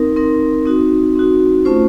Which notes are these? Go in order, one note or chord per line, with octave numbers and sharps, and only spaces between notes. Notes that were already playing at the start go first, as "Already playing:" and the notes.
Already playing: C4 D#4 A#4
C4 D#4 A#4
C4 D#4 F#4
C4 D#4 F#4
A3 C#4 F4 C5